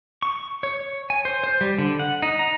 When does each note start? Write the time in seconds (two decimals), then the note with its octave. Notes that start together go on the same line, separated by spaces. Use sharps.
0.22 C#6
0.63 C#5
1.10 G#5
1.25 C5
1.44 C5
1.61 G3
1.79 D3
1.99 F#5
2.22 D#4
2.39 A#5